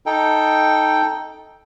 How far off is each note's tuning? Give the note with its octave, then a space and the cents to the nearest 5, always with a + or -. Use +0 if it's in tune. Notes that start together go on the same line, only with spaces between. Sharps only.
D#4 +5 A4 +0 G5 +0